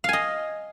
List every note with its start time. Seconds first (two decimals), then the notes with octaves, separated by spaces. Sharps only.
0.04 F5
0.09 G#5
0.13 D#5